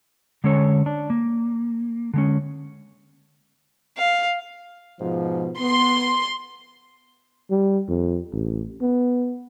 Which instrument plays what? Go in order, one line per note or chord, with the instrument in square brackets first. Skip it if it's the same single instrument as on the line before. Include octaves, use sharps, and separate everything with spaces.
[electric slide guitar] D3 G#3 C#4 A4 C#5
D4
A#3
D3 G#3 C#4
[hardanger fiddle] F5
[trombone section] G#2 B2 F3
[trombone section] B3 [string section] C6
[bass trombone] G3
F2
A1
B3